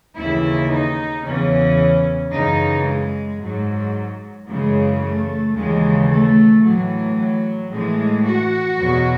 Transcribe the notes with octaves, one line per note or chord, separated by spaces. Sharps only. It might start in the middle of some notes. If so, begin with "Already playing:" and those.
D#2 C#3 E3 E4
D#4
E2 C#3 E3 C#4
F#2 C#3 E3 D#4
G#3
G#2 F#3
F#2 C#3 E3 G#3
A3
D#2 C#3 E3 G#3
A3
A2 E3 F#3
F#3
A2 E3 G#3
F#4
E2 B2 F#3